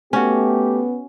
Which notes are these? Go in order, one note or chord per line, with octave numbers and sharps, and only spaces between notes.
A3 B3 C#4 F#4 G4